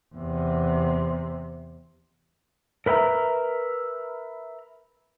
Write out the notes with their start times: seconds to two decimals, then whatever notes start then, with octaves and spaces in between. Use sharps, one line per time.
0.15 E2 C3
2.86 A#4 B4 E5 G5 A#5